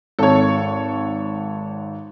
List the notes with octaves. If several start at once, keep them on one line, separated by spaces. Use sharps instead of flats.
G#1 A4 C#5